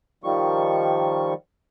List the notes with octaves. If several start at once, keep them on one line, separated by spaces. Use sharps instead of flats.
D#3 F3 G3 C#6